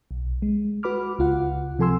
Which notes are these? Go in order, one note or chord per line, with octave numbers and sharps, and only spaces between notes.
B1
G#3
F#4 B4 B5 D6 F6
C#2 F4 F#5
C3 F3 A4 G#5 C6 E6